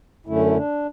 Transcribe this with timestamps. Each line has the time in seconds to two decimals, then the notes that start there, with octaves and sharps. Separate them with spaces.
0.26 F#2 D3 A3 C#4 E4
0.46 E4
0.56 D4